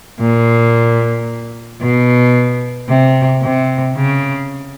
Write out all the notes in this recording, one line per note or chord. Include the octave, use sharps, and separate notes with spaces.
A#2
B2
C3
C3
C#3